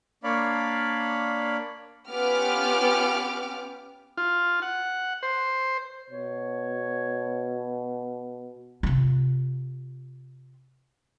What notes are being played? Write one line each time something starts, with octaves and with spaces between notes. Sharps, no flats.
A#3 D4 C#5 D5 F5 B5
B3 C#4 F4 G4 D6 F6
F4
F#5
C5
B2 C#5
C3 F4